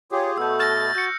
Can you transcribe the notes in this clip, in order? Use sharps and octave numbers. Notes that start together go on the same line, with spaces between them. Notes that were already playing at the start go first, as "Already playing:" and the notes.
F4 G4 G#4 C#5
B2 A3 B3 A4 E6 G6
F6 A6 A#6
F#4 G6 C#7